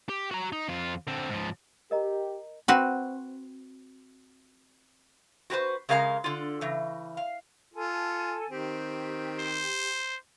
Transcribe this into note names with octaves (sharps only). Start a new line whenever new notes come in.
G4
F#4 A#5
D#4
F2 F4
D3 C4
G#2 F3
G4 A#4 D#5 A#5
C4 F#4 B4
F#4 G4 B4 C5
C#3 G#3 A#4 F5 G#5 A#5
D3 F4
C#3 E3
F5
F4 A4 G#5
D#3 C4 G4
C5